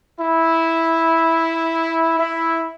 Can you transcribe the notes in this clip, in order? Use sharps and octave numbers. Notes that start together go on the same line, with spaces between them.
E4
E4